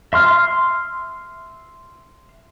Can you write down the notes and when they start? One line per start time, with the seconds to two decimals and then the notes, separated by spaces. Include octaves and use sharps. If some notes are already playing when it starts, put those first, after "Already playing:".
0.13 E5 C6 F6